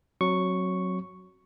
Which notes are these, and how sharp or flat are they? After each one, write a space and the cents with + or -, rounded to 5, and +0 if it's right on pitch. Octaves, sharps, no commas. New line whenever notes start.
F#3 +0 C4 +30 C#6 +0